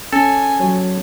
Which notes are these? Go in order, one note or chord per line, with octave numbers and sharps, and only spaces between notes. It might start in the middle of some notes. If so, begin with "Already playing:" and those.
C#4 A4 G#5
F#3 C#5